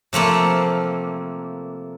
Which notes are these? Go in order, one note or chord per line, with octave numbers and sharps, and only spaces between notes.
C3 F3 A3 A#3